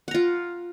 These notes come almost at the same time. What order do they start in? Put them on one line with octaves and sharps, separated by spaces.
F#5 A#5 F4